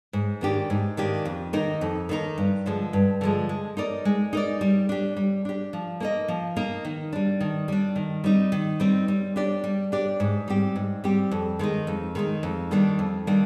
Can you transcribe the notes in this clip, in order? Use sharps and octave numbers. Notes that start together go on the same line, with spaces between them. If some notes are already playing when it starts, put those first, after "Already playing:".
G#2
D#3 A#3 D4 G4
G#2
D#3 A#3 D4 G4
F2
D#3 A#3 D#4 A#4
F2
D#3 A#3 D#4 A#4
G2
D3 F3 G#3
G2
D3 F3 G#3
G#3
D#4 A#4 D5
G#3
D#4 A#4 D5
G3
D4 G4
G3
D4 G4
F3
A#3 D#4 A#4 D#5
F3
A#3 D#4 A#4 D#5
D#3
G3 D4
D#3
G3 D4
D#3
G3 C4 D#4
D#3
G3 C4 D#4
G3
D4 G4 D5
G3
D4 G4 D5
G#2
G3 C4 G4
G#2
G3 C4 G4
F2
D#3 G#3 D#4
F2
D#3 G#3 D#4
F2
D#3 G3 A#3 D4
F2
D#3 G3 A#3 D4